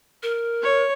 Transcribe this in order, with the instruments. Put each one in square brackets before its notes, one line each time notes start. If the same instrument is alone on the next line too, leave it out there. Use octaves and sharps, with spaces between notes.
[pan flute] A#4
[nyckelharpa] C#5